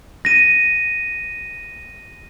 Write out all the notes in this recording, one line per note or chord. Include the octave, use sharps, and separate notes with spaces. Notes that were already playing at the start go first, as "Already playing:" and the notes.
A#6 D#7